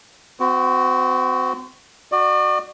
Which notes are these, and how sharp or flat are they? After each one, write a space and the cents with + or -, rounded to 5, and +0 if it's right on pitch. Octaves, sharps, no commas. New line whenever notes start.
C4 -35 F#4 +0
F#4 +0 D5 +40